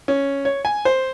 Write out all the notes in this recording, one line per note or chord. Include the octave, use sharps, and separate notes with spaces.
C#4
C#5
G#5
C5